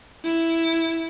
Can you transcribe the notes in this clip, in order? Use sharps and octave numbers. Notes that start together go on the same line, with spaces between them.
E4